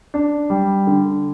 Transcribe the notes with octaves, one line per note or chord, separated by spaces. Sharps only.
D4
G3
D3